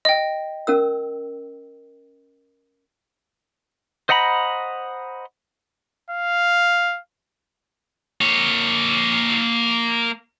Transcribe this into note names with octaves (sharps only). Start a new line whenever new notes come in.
D#5 G5
C#4 A#4 E6
C5 D#5 F#5 A#5 B5
F5
A#3 C#5